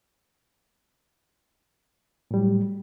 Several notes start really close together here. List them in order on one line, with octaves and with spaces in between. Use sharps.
A2 G3 F#3